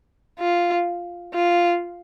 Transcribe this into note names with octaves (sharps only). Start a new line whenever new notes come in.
F4
F4